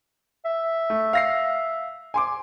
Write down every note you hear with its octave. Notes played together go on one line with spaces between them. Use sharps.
E5
A3
F5 A#6 C7
G#5 C6 D6